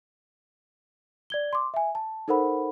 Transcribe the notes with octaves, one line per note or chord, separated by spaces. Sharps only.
D5 G#6 G7
C6 D6
E5 G#5
A5
D#4 A4 A#4 C5 F#5 B5